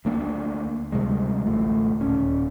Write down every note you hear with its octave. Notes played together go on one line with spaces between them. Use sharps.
D2 A#3 D4
D2 C3 G3 G#3
A1 D2 A3
D#1 C#4